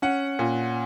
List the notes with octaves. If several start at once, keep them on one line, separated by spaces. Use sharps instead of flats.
C#4 F#5
A#2